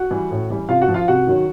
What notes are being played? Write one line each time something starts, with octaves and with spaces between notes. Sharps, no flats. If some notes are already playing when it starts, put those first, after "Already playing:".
Already playing: F#4 F#5
E3 G3
A2
E3 G3
C3 F4 F5
F#4 F#5
F3
F4 F5
C3 F#4 F#5
D#3 F#3